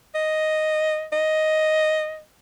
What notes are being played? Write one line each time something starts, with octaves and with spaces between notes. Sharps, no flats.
D#5
D#5